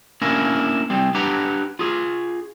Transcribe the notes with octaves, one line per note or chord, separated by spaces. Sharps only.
A#3 C#4 D4 E4 A#4
G3 C4
D4 G4 B4 F#5 A#5
F4 G#4